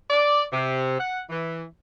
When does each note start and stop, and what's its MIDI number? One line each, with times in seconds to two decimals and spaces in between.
0.10 0.44 74
0.53 0.96 48
1.00 1.20 78
1.30 1.63 52